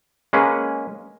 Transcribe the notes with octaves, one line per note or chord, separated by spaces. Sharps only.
G#3 A#3 C#4 G#4 B4